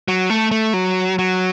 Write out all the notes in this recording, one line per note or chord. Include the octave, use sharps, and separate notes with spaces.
F#3
A3
A3
F#3
F#3